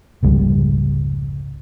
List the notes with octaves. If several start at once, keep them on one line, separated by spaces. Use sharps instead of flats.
F1 C#2 G#2 G3